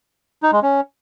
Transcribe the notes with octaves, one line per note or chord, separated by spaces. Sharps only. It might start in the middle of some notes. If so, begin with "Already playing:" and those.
D#4
G#3
C#4